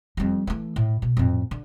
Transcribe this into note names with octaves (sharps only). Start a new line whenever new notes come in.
F2 G3
E3 A3
A2
B2
F2 A2
D3